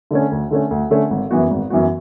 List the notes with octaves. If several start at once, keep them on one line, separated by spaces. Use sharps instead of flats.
D3 A3 C#4
D2
D3 A3 C#4
D2
D3 A3 C#4
G#1
F#2 E3 B3 F#4
G#1
F#2 E3 B3 F#4